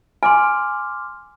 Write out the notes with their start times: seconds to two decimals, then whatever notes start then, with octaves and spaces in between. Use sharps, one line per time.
0.23 G#5 C6 D6 F6